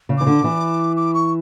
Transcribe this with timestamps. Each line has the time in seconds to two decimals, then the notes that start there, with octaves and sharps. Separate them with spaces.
0.09 C#3
0.18 E3 D6
0.27 D3
0.44 E3
0.97 D6
1.14 C#6